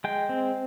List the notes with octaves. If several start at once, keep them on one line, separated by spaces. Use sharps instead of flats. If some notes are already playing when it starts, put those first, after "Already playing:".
G#3 G5
C4